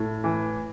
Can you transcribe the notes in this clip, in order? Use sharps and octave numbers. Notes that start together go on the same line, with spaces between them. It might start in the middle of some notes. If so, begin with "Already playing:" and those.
Already playing: A2
E3